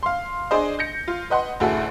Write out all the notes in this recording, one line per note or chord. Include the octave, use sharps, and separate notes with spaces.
F5 C6
D4 G#4 C5 D#5
G6 A#6 C#7
F4
B4 D#5 F#5 C6
A1 D2 E4 F#4 G#4 A4